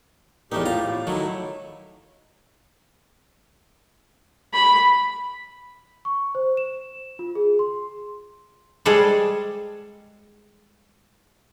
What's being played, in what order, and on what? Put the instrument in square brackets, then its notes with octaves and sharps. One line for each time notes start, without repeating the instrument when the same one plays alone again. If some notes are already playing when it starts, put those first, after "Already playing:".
[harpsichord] E2 A3 D#4 [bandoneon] A2 G4 [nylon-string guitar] A#4
[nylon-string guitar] F4 [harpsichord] A#5 D6
[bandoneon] A2
[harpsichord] D#3 F#3 A3 [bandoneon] E4
[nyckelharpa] B5
[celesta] C#6
C5
E7
F4
G#4
C6
[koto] G3 G#3 G#4 A4 C5 D5